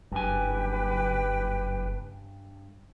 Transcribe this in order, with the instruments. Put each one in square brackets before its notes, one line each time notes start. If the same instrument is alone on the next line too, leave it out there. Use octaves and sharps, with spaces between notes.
[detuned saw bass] F#1 [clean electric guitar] G2 G#5 [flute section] G4 B4 G5